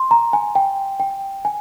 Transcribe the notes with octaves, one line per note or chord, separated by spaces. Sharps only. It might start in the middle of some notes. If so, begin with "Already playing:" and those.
Already playing: C6
A#5
G#5
G5
G5
G#5